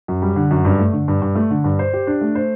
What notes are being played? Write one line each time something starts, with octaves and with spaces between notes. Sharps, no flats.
F#2
G3
D3
F#2
G2
A3
D3
G2
G2
A3
D3
G2
C5
G4
D4
A3
C5